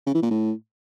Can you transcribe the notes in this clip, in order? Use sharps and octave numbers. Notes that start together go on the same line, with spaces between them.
C#3
E3
A#2
A2